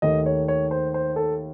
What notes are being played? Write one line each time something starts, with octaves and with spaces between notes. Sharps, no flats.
D#2 D#3 A3 D#5
C#5
C#5
C5
C5
A4